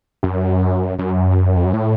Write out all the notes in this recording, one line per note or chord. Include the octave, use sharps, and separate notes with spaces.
F#2
F#2
F2
F#2
A2